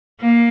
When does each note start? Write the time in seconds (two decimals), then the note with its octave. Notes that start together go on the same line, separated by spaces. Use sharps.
0.20 A#3